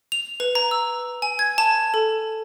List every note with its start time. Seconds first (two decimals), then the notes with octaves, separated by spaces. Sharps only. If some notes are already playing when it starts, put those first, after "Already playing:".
0.12 F7
0.40 B4
0.55 A#5
0.71 E6
1.22 G#5
1.39 G#6
1.58 A5
1.94 A4